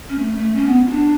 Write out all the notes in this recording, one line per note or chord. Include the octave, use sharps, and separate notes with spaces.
C#4
A3
A3
C#4
B3
F4
D4